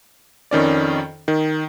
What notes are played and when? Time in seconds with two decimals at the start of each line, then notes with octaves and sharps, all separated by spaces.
0.51 F2 D#3 C#4 D5
1.28 D#3